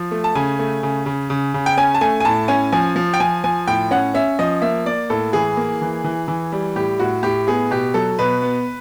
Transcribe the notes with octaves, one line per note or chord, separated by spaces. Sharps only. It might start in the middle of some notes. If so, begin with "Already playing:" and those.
Already playing: F3
A3
A5
C#3 G#5
A3
C#3
C#3
C#3
C#3
G5
C#4 G#5
A5
A3 G#5
G#5
A2 A5
C#4 G#5
F3 G#5
F3
G5
F3 G#5
F3 G#5
A2 G5
C#4 F#5
C#4 E5
F3 D#5
A#3 E5
A#3 D5
A2 A4
E3 G#4
A#3
E3
E3
E3
G3
A2 G4
A2 F#4
A2 G4
B3 G#4
B2 G4
F#3 A4
B2 B4
B3